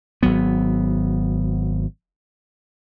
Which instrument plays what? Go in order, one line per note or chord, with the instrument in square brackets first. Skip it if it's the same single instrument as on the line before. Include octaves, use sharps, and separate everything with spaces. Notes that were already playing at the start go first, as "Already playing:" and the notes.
[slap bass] G#1 F#3 B3